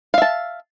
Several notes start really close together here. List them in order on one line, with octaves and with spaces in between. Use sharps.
F5 E5 A5